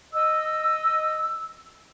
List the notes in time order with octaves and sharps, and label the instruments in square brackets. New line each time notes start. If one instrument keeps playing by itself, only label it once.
[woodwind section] D#5 E6